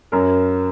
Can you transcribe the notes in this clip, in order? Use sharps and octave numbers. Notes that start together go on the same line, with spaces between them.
F#2 A#4